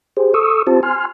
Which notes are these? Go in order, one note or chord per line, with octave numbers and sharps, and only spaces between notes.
G4 G#4 C5
A4 C#6 D#6 E6
C4 F4 G4 C5 A5
G#5 C6 F6